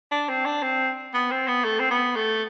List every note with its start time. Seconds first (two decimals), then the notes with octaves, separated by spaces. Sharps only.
0.11 D4
0.29 C4
0.45 D4
0.63 C4
1.14 B3
1.31 C4
1.48 B3
1.65 A3
1.79 C4
1.90 B3
2.16 A3